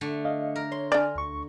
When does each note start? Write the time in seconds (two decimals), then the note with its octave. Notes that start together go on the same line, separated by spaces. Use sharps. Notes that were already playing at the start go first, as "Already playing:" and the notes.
0.01 D3 A3
0.25 D#5 F5
0.56 A#4
0.72 C#5 C6
0.92 D4 D5 G#5 F6
1.15 D2 C#6